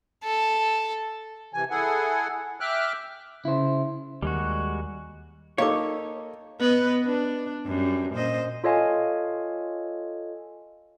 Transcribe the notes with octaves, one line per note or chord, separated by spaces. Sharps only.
A4
C3 E3 G#5
E4 G#4 A4 F#5 G#5
E5 G5 D6 F6 F#6
C#3 E4 C5
D#2 G3 G#3 F#4
A#3 D#4 A4 C#5 F5 D6
B3 B4 D#5
D4
F#2 G3
A#2 C5 D#5
F4 A4 C#5 D#5 F5 G#5